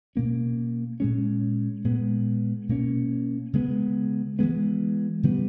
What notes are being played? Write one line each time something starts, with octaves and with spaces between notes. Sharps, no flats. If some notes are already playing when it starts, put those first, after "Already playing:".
B2 A#3 C#4
A#2 G#3 C#4
A#2 G#3 B3
B2 A#3 C#4
C#3 G#3 B3
E3 G#3 B3
C#3 E3 G3 B3